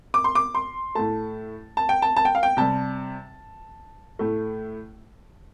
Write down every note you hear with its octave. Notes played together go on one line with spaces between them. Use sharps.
D6
C6
D6
C6
A2 A3 A5
A5
G5
A5
A5
G5
F5
G5
C3 G3 A5
A2 A3